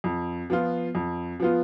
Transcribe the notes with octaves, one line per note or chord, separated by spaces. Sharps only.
F2
F3 B3 F4
F2
F3 B3 F4